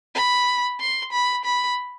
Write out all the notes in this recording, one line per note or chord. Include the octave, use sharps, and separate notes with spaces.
B5
C6
B5
B5